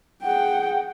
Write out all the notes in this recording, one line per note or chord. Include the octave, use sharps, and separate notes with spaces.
G#4 F#5 G5